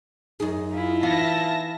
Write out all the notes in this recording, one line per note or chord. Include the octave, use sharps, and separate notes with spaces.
F#2 D#4 G#4
E4 F4
E3 B3 E5 F5 A5 A#6